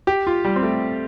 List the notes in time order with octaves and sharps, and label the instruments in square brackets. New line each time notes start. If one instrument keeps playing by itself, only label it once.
[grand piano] G4
F4
G3
C4
A3